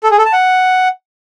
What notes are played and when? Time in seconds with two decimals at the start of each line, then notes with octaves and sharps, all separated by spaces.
0.04 A4
0.11 G#4
0.18 A4
0.26 A5
0.33 F#5